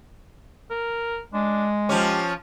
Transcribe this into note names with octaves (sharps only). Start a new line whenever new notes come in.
A#4
G#3 D4
F3 C#4 G4